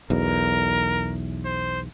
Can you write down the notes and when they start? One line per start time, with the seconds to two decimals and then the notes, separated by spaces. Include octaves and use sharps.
0.10 B1 E2 A#4
1.46 C5